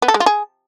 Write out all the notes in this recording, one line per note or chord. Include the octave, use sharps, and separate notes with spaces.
B3
A4
G#3
F4
G#4